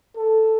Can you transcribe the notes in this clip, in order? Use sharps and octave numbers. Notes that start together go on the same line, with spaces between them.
A4